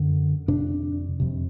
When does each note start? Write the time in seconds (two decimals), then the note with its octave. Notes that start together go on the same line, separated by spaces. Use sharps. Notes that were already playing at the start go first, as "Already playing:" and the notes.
Already playing: F#2 D3
0.48 F2 C3 D4
1.20 F2 C3